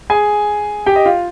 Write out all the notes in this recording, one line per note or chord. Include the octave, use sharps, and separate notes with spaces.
G#4 G#5
G4 G5
D#5
F4 F5